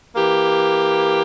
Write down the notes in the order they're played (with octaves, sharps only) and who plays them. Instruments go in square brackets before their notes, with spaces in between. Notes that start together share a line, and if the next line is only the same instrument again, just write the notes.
[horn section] E3 A#3 G4